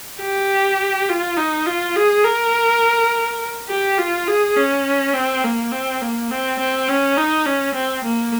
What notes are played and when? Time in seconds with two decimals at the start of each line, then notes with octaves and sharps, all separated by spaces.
0.21 G4
1.09 F4
1.37 D#4
1.66 F4
1.96 G#4
2.24 A#4
3.69 G4
3.98 F4
4.28 G#4
4.56 C#4
5.14 C4
5.44 A#3
5.72 C4
6.02 A#3
6.31 C4
6.59 C4
6.88 C#4
7.17 D#4
7.46 C#4
7.75 C4
8.04 A#3